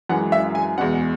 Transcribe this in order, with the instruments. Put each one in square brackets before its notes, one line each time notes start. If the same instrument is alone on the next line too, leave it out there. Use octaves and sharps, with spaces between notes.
[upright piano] F#2 E3 G#3 F#5
E5
G#5
E2 B2 G#3 F#5